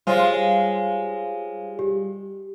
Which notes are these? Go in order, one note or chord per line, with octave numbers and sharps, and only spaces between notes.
G3 G#3 F4 C5 C#5 F5
G4